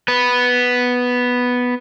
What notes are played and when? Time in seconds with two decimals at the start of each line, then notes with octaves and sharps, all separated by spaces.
0.08 B3 B4